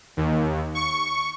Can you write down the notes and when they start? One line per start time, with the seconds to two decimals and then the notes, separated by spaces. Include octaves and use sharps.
0.17 D#2
0.75 C#6